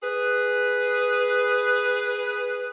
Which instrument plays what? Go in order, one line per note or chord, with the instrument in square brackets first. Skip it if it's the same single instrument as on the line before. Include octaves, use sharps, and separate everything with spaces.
[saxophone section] G#4 B4